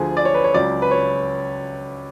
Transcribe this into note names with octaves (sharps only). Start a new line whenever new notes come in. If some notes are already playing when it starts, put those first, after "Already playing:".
Already playing: D2 D3 F3 G#4
D5
C#5
B4
C#5
C#2 C#3 F#3 D5
B4
C#5